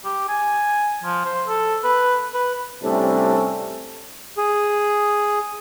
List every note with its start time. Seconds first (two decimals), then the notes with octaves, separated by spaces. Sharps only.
0.05 G4
0.28 G#5
1.04 F3
1.25 C5
1.47 A4
1.84 B4
2.34 B4
2.83 A2 C3 G3 C#4 D4 A4
4.37 G#4